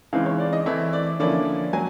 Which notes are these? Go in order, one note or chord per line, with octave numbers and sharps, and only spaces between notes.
C#3 E3 G#3 C4 D#4 F5
C#5
D5
D#5
E3 A3 C4 E4 E5
D5
D3 F3 A#3 C#4 E4 D5
F#3 G#5